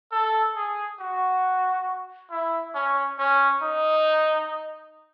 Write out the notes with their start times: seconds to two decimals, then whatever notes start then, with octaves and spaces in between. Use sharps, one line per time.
0.12 A4
0.56 G#4
0.99 F#4
2.30 E4
2.74 C#4
3.18 C#4
3.62 D#4